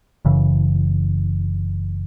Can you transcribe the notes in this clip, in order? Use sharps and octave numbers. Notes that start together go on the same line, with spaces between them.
F#1 F#2 C#3 E3